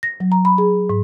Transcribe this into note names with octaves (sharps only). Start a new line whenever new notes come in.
A#6
F#3
A#5
B5
G#4
G#2